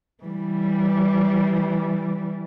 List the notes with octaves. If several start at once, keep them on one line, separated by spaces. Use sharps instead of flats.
E3 G3